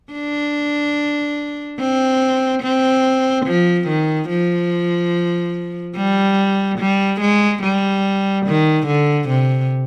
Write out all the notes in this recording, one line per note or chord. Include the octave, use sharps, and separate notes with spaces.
D4
C4
C4
F3
D#3
F3
G3
G3
G#3
G3
D#3
D3
C3